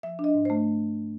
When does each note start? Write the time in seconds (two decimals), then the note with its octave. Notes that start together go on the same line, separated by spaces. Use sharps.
0.03 F3 E5
0.19 D4
0.24 D#5
0.34 G#2
0.45 C5
0.50 A3